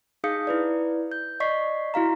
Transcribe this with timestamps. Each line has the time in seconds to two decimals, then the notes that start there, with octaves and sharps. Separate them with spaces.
0.24 D#4 G#4 F5 D#6 G6 C#7
0.47 E4 B4 D5
1.12 G6
1.40 D5 D#5 C#6 B6 C7
1.94 E4 F#4 F5 A#5